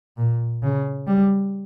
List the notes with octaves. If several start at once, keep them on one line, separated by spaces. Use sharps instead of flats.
A#2
C#3
G3